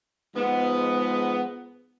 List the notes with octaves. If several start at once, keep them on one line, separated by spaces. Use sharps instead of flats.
G#2 F3 G#3 B3